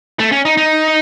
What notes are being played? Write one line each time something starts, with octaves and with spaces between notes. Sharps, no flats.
A3
C#4
D#4
D#4